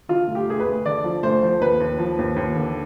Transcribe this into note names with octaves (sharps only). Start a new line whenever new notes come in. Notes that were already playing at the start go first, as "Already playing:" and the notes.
D3 F4
D2
G4
D2 G#4
B4
D2
D3 D5
F3
D2 C5
F3
D#2 B4
D#2
F3
D#2
D#2
D3